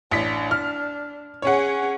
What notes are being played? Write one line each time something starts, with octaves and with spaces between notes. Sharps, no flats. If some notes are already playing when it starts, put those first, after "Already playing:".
A1 D4 B6
F6
C#4 G#4 C#5 F#5